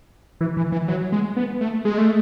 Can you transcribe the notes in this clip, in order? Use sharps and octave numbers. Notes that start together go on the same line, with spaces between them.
E3
E3
E3
F#3
G#3
B3
A3
G#3
A3